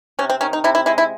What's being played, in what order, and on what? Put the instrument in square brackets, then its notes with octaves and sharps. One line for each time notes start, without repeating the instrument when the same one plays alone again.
[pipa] C3 C#4
C4
D#3 C#4
D#4
C3 E4
E4
G#3 E4
E4